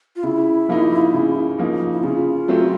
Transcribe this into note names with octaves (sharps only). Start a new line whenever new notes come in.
F4
C#3 E4
F3 A#3 D#4
C#3
F3 A#3 D#4
E4
C#3 F4
F#3 A3 C4